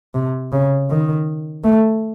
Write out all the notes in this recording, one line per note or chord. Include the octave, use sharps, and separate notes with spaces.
C3
C#3
D#3
A3